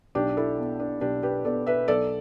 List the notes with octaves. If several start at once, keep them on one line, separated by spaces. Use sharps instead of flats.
B1 D4 G4
E4 A4
B2
D4
B1 D4 G4
G4 B4
B2 A4 D5
B4 E5
B1 A4 D5